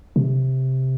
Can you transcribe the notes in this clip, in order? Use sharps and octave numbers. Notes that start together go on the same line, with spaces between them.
C3